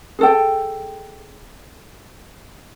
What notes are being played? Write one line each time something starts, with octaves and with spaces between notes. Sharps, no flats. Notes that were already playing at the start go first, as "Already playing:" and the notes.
G#4 A4 G5